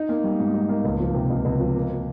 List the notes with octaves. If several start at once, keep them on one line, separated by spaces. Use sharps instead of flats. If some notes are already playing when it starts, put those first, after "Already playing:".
Already playing: D#4
A#3
G3
G#2
D#4
A#3
C#2
F3
C3
C#2
C#2
F3
A#3
F3